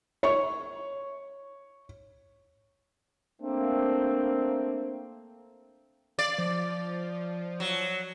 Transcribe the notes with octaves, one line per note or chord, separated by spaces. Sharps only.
C#5 C#6
A3 A#3 C4 D4
D5 F5
F3
F#3